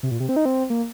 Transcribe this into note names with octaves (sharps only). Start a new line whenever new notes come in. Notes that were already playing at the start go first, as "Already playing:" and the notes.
C3
A#2
C3
C4
D#4
C4
A#3